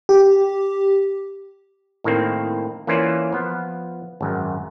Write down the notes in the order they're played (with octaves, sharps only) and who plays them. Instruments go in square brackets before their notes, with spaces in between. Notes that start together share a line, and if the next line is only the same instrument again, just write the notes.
[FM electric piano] G4
[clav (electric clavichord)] A2 D#3 A#3 C4
E3 A#3 C#4 F4 C5 D5
F3 B3
G#1 F#2